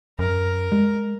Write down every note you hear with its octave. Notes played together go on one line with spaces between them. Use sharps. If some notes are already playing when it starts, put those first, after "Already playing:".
F#2 A#4
G#3